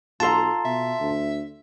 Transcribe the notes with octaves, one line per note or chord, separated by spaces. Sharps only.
B1 F4 A4 A5 A#5 C6
B2 E5
D2